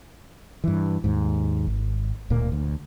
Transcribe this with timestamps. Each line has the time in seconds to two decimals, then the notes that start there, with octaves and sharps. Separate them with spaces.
0.64 G2 E3
1.04 D#2 G#2
1.67 G#1
2.30 D1 D2 A#2 A#3
2.52 D2